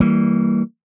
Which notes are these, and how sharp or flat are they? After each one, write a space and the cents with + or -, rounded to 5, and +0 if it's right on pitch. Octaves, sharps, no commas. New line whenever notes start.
E3 -25 G3 -5 A#3 -10